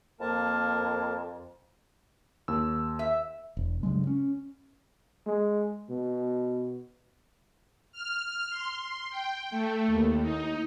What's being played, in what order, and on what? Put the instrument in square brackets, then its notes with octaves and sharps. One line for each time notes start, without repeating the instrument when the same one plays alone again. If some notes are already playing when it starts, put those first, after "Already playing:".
[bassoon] F2 [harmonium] A#3 A#4 A5
[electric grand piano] D#2 E6
[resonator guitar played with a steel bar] E5
[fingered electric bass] E1
G2 C#3 F#3 G#3
C#4
[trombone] G#3
B2
[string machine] F6
C6
G5
A3
D#2
D#4